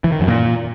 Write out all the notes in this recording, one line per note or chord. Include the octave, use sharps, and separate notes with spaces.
E3
D#3
F#2
A#2